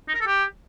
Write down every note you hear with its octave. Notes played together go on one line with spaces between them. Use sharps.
D#4
A#4
A4
G4